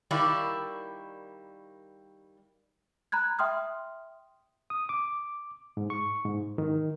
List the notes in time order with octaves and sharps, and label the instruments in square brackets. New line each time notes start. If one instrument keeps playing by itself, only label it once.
[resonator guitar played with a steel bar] D#3 G3 A#3 E4 D5
[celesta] A#5 B5 F#6 G#6
E5 G5 C6 D#6 F6
[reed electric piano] D#6
D6
G#2
C#6
G#2
D#3